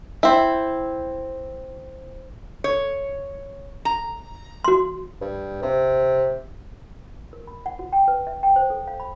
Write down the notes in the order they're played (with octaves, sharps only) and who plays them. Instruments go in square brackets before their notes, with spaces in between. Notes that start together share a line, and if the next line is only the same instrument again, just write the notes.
[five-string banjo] C4 E4
[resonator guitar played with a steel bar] C#5
A#5
[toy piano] F#4 C6
[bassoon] G2
C3
[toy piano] A#4
B5
F#5
F#4
G5
B4
E5
G5
C5
A4
F5
B5